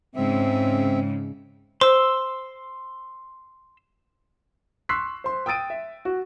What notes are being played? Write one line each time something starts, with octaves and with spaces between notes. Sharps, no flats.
G#2 C#3 C4 E5
C5 C6 E6
C6 C#6 E6 F#6 B6 C7
C5 C6
G5 D#6 E6 A6 D7 D#7
E5
F#4